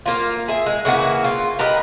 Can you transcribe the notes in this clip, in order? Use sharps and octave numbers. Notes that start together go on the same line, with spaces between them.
A#3 F4
G#4 E5
G#3
C#3 E3 A#3 F#4
F4
G4 A#4 B4 D#5